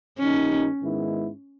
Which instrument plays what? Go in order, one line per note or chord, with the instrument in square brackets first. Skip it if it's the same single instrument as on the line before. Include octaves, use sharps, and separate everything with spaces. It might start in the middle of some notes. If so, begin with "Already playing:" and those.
[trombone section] G2 D#3 A#3 D#4 G4 [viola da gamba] C#4
[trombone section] G#2 D#3 G#3 B3 E4